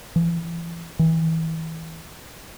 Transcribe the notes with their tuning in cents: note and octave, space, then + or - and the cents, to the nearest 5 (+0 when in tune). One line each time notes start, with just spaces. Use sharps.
E3 +35
E3 -30